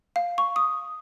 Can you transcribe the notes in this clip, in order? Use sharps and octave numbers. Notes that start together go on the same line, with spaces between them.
F5
C#6
D#6